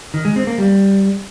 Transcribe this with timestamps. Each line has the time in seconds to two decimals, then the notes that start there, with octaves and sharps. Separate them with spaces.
0.14 D#3
0.25 G#3
0.36 C4
0.47 A#3
0.58 G3